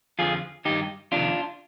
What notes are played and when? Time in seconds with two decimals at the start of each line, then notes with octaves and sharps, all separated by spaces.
0.19 F2 D3 F3 F4 G#4
0.65 G2 D#3 D#4 G4
1.12 F2 C3 D#3 D4 F4